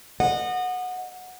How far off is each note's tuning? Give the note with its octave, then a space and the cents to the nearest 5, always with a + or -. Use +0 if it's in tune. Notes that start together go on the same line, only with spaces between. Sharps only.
D#5 -30 F#5 -20